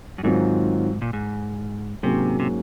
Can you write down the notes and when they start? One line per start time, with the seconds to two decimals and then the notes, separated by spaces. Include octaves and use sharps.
0.18 F#2
0.23 G#2 D#3 F#3 C4 F4
1.02 A#2
1.13 G#2
2.03 G#2 C3 F#3 A#3 C#4
2.40 C3